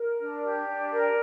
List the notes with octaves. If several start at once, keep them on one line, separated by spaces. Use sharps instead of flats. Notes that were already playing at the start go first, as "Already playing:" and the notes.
Already playing: A#4
D4
G4
D4
A#4